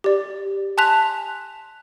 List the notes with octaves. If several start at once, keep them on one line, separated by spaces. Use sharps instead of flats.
G4 D5
G#5 A5 C6 F#6 B6 F7